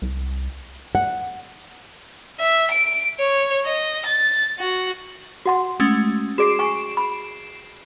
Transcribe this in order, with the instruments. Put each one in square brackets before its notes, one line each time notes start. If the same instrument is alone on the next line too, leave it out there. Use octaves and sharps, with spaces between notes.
[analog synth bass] C2
[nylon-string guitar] F#5
[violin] E5
D7
C#5
D#5
A6
F#4
[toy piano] F#4 F#5 C6
[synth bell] G#3 A3 C#4
[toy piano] F#4 G#4 D5 [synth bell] C7 D7 E7
[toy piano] G#5 C#6
B5